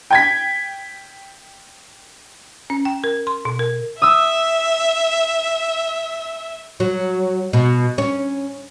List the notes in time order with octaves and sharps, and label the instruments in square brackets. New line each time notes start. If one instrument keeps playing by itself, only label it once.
[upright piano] G5 G#6 B6
[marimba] C#4
G5
A#4
C6
B2
A#4
[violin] E5 [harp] D#6 E6
[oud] F#3
B2
C#4